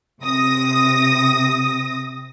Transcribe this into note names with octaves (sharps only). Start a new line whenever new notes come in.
C3 D#6 A#6